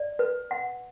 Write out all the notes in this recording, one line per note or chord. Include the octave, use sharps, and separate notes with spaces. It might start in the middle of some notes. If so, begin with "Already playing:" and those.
Already playing: D5
B4
F#5